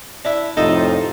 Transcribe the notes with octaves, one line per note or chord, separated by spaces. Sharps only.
D4 E4 D5
F2 A2 C3 D#4 F4 A4 D#5 A5